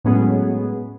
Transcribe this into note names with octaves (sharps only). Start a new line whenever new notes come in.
A2 F#3 G#3 B3 C#4 G#4